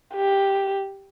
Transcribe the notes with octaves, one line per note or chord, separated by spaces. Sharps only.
G4